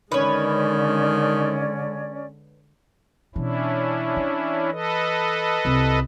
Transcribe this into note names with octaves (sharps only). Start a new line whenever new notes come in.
D3 D#3 G#3 C#4 B4 C#5 D5
B2 E3 C#4 D4 E4
E3
A4 B4 D#5
C2